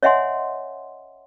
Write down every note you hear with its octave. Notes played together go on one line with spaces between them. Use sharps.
C#5 D#5 E5 F#5 G#5 C6